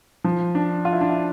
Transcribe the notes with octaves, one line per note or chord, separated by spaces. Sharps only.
F3
D4
F4
E4
D4
E4